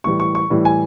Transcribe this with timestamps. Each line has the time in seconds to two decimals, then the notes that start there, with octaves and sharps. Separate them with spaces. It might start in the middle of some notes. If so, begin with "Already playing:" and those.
0.04 A2 E3 G3 C#6
0.20 C#6
0.35 C#6
0.50 A2 E3 G3
0.65 G#5